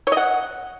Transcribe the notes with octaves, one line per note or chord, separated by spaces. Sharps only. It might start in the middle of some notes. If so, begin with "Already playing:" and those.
C#5
D#5
F#5